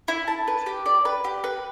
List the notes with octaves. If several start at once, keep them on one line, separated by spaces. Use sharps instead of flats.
E4
A5
B4
G4
D5
B4
G4
B4